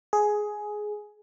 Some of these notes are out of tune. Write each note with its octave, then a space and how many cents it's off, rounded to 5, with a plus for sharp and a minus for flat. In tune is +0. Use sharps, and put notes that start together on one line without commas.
G#4 +10